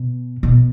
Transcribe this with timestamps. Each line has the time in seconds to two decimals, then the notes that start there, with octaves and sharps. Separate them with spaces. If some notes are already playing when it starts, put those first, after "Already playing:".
Already playing: B2
0.43 B2